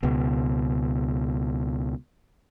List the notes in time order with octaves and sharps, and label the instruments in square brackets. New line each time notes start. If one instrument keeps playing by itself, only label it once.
[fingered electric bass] C#2 B2